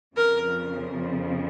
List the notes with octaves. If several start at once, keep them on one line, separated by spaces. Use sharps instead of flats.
F2 C#3 F3 A#4